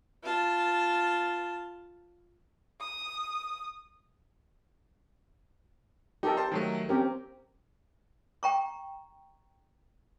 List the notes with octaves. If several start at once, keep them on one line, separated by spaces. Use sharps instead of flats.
F4 A5
D#6
D#4 G4 A4 A#4
C5 A5 C6
D#3 F#3 A3
C4 C#4 G4 A#4
G5 A#5 C#6